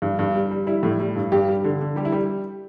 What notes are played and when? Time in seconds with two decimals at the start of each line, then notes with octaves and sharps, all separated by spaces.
0.02 G2
0.19 G2
0.35 G3
0.51 G3
0.67 G3 E4
0.83 A2
1.00 G3
1.16 G2
1.32 G2 G4
1.48 G3
1.64 D3
1.81 D3
1.96 G3 G4
2.05 E4
2.12 G3 G4